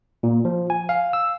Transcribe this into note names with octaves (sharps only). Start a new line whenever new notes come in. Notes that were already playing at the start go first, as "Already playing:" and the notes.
A#2
F3
G#5
F5
E6